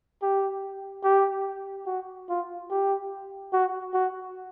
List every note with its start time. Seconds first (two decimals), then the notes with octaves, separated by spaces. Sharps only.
0.22 G4
1.04 G4
1.87 F#4
2.29 F4
2.70 G4
3.53 F#4
3.94 F#4